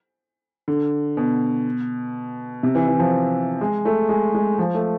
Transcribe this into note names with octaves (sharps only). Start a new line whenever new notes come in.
D3
B2
C3
E3
E3
F3
G#3
A3
G#3
G#3
F3
A3